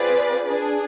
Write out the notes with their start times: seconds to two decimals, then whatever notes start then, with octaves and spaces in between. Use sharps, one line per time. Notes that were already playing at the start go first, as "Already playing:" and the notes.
Already playing: C4 F4 G#4 B4 D5
0.47 D4 G#4